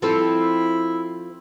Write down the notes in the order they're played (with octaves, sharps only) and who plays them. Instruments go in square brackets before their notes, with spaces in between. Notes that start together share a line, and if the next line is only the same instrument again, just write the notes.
[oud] F3 C4 A4 [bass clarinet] E4